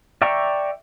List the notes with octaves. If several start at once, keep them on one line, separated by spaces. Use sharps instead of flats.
D5 E5 G5 A#5 C#6